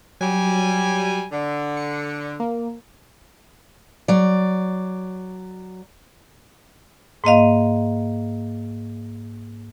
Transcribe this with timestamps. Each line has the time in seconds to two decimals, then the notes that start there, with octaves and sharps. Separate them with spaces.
0.21 F#3 G3 G#5
1.31 D3
1.77 C#7
2.40 A#3
4.08 F#3 D5
7.24 G#2 A#3 D#5 F5